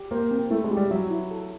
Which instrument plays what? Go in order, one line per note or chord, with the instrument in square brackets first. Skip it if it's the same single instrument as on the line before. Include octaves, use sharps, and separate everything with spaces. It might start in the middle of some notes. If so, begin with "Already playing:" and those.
Already playing: [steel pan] G4
[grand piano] A#3 [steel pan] C5
[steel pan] C4
[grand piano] A3 [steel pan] E4
[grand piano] G#3
[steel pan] G4
[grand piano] G3
[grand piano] F#3 [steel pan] E5
[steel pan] E4
A4